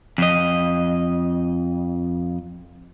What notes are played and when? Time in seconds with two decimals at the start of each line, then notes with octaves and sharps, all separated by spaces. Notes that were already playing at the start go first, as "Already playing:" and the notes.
0.18 F2 D#5